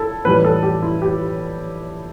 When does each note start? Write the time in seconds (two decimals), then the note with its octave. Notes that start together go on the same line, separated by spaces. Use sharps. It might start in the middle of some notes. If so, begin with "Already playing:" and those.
Already playing: E4 A4
0.25 A2 E3 G3 B4
0.44 A4
0.63 G4
0.82 E4
1.02 G4